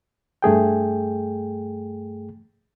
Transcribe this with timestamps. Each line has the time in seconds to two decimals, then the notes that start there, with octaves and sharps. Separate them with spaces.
0.42 G2 A3 G#4 G5